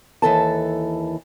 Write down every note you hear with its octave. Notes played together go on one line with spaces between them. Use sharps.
D#2 E3 A4 A5